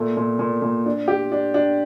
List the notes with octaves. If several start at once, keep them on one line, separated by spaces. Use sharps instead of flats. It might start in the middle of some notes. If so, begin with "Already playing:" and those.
Already playing: A#2 A3
A#2
A#2
A#2
D4
G4
D4
D4